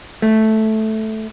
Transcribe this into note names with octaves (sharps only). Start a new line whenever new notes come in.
A3